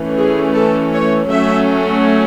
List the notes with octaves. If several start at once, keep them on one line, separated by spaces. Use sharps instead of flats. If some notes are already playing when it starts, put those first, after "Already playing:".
Already playing: E3 A3 C#4
G#4
A4
C#5
F#3 A3 C#4 E5